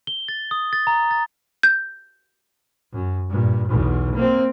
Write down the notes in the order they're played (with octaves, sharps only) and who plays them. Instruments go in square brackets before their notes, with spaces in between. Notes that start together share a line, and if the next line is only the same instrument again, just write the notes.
[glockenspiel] G7
A6
D#6
A6
A#5
A6
[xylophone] G6
[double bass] F#2
G2 A#2
B1 E2
A#3 C4